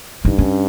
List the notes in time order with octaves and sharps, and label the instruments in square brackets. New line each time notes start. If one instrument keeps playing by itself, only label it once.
[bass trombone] G2 [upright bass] D#4
[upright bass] C#4